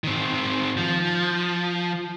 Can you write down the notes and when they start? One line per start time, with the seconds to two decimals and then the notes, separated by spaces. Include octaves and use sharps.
0.04 D#3 C4
0.77 F3